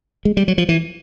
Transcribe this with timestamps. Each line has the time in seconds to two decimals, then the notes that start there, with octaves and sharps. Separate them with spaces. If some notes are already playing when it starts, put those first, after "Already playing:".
0.25 G#3
0.37 G3
0.48 F#3
0.58 F3
0.69 E3